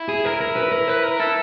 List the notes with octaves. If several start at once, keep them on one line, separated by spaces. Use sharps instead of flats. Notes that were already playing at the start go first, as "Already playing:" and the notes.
Already playing: E4
G#4
A#4
A#4
B4
A#4
B4
A#4
E4 A4